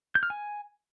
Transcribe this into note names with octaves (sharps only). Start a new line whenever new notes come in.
G6
F6
G#5